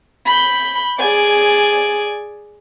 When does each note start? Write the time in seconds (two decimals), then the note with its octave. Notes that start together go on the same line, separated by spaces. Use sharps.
0.25 B5 G6
0.97 G#4 D5 G#5